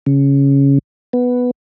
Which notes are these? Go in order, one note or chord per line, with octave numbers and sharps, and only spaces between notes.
C#3
B3